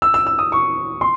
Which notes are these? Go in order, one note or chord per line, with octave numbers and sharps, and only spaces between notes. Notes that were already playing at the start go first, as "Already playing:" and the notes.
E6
E6
E6
D#6
C#6
C6